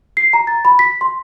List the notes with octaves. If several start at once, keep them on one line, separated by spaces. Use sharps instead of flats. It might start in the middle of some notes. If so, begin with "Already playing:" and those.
C7
A#5
A6
B5
B6
C6